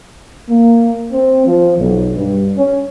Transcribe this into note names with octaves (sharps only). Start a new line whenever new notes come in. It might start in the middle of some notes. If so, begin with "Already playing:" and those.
A#3
C4
F3
B1
G2
C#4